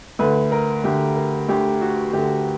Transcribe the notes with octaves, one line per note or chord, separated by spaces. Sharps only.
D2 D3 B4
A#4
D2 D3 G4
A#4
D2 D3 G4
F#4
D2 D3 G4